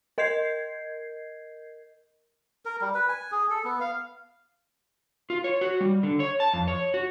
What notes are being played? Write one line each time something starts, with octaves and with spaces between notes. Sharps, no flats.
A#4 D#5 G6 G#6 C7
A#4
G3
B4
G#5
G#4
A4
B3
F5
F4
C#5
F#4
G3
D3
C#5
A5
F2
C#5
F#4